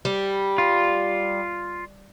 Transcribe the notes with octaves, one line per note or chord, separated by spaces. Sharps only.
G3
F4